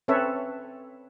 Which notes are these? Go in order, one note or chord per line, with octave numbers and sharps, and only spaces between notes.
C4 C#4 A4 B4 C#5 E5